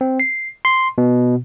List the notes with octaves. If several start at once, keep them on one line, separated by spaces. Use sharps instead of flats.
C4
C7
C6
B2